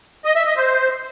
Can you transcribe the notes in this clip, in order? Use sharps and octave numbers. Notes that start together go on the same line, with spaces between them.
D#5
E5
D#5
C5